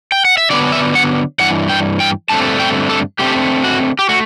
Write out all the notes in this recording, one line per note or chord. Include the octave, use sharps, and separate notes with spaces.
G5
F#5
E5
D3 F#3 B3 D4 D5
E5
F#5
G2 E3 F#5
G5
G5
G2 D3 A3 C4 A5
G5
A4
D3 A3 C4 G4
F#4
G4
A3 F#4